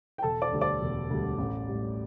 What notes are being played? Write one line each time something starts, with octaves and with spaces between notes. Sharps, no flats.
G5
E1 A4 A5
D5 D6
D2 D3 G3
D5 D6
E1
D2 D3 G3
A1
A2 G3